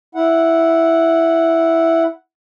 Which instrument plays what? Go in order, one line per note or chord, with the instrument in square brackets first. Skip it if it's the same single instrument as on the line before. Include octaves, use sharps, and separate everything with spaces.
[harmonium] E4 F#5